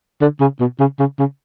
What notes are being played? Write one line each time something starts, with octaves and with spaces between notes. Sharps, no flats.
D3
C#3
B2
C#3
C#3
C#3